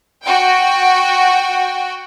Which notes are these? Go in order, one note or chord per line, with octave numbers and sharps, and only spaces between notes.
F#4 G5